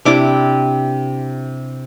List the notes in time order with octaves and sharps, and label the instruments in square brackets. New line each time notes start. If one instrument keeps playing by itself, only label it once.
[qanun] C3 D4 E4 D6